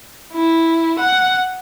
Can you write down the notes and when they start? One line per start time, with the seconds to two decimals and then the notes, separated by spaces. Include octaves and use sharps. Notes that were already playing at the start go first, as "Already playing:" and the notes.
0.33 E4
0.99 F#5